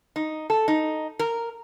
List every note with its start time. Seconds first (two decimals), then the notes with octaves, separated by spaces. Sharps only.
0.16 D#4
0.50 A4
0.68 D#4
1.19 A#4